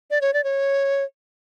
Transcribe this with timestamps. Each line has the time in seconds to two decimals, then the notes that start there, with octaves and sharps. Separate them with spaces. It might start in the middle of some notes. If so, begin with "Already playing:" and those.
0.11 D5
0.21 C#5
0.34 D5
0.44 C#5